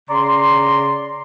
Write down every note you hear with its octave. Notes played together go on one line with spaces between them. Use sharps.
C#3 D5 A#5 C6